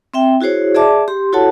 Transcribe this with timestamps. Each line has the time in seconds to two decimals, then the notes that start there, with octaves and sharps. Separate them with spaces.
0.14 C4 E5 G5
0.41 E4 F#4 G#4 C5 C#5
0.75 G#4 D5 E5 A5 D6
1.08 G4 C6
1.33 E4 F#4 A4 C#5 F#5 A5